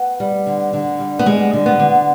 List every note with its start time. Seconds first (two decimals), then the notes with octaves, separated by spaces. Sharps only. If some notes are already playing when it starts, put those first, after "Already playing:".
Already playing: B3
0.20 G3
0.47 D3
0.73 D3
1.00 G3
1.19 B3
1.26 G3 G#3
1.53 D3
1.66 B3
1.80 D3